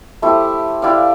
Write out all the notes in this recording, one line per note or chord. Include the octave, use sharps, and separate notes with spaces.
A3 E4 G4 C5
E4 G4 D5 F5